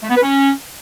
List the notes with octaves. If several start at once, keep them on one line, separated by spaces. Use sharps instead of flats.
A3
B3
B4
C#4